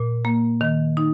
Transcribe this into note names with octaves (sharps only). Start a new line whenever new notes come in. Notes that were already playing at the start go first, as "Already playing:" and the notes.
Already playing: A#2
A#3
D#3
D#4